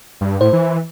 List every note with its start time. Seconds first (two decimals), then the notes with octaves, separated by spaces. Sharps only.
0.21 G2
0.41 A2 C5
0.53 E3